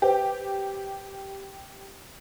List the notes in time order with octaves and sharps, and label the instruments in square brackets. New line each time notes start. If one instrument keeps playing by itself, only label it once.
[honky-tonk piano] G4 [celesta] B4 C5 G5